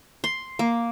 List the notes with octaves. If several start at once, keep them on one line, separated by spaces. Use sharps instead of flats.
C6
A#3